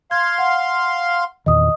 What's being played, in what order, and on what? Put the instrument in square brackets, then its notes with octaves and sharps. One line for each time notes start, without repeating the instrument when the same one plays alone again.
[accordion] F5 C6 [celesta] G#6
[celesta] F#5
[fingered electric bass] E2 A#2 D#3 [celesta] D#5 D#6